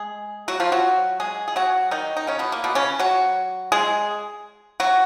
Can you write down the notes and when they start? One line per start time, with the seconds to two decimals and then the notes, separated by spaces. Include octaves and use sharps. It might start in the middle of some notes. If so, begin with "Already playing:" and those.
Already playing: G#3 G#4
0.48 F#3 F#4
0.60 F3 F4
0.72 F#3 F#4
1.20 G#3 G#4
1.48 G#4
1.56 F#3 F#4
1.91 D#3 D#4
2.17 D#4
2.27 C#3 C#4
2.39 B2 B3
2.52 A#3
2.64 B2 B3
2.75 C#3 C#4
2.99 F#3 F#4
3.72 G#3 G#4
4.80 F#3 F#4